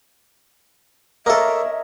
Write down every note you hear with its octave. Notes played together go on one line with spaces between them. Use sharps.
A#3 A4 A#4 C#5 D#5 E5